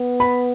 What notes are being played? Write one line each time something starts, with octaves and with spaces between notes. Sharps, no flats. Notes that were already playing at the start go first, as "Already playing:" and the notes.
Already playing: B3
B5